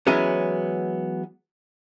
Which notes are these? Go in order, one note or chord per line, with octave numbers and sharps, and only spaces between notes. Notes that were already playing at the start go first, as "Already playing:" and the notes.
E3 F#3 G#3 B3 C#4